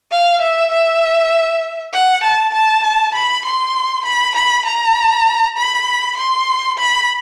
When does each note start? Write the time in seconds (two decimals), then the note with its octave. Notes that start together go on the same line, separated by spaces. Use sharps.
0.11 F5
0.41 E5
0.72 E5
1.93 F#5
2.23 A5
2.54 A5
2.83 A5
3.15 B5
3.45 C6
4.05 B5
4.35 B5
4.65 A#5
5.57 B5
6.17 C6
6.78 B5